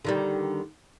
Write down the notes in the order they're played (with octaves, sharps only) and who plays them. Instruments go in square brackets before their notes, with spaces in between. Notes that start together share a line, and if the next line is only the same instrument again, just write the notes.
[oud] D3 D#3 G3